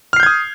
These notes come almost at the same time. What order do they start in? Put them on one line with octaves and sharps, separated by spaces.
F6 C7 G6 G#6 D#6